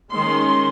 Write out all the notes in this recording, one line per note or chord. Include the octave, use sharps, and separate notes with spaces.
D#3 G#3 C#4 C6